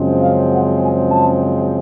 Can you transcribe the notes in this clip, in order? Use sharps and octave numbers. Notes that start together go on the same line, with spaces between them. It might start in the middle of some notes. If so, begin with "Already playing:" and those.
Already playing: F#2 C#3 F3 G#3 C4
F5
F#5
G#5
A5